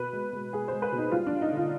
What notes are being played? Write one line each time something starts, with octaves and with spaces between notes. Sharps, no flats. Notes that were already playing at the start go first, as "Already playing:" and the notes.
Already playing: B2 B4
G#3
G#3
G#3 G#4
G#3 C5
B4
B2
D#4
G3 F4
D4
G3
D#4
D3
F4